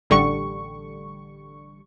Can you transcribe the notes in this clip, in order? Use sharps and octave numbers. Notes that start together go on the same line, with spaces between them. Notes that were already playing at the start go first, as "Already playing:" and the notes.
A1 D3 G3 C#6